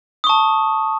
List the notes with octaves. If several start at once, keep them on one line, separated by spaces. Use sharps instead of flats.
A5 C#6 D#6